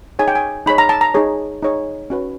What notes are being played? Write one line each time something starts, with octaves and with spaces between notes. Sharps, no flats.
D#4 G#4 C#5 G#5
G5
G#5
D#4 G#4 C#5 B5
A#5
A5
A#5
D#4 G#4 C#5
D#4 G#4 C#5
C#4 F#4 B4